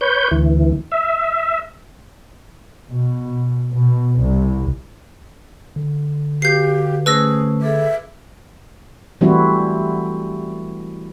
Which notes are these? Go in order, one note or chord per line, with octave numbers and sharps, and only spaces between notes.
B4 C#5 G6
D2 E3
E5
B2
B2
C2
D3
F#4 G4 B4 F5 G6 C7
A3 C#4 G#4 B4 C5 E6 A#6
G#4 A4 E5 D6
E3 G3 A3 C4 E4 F#4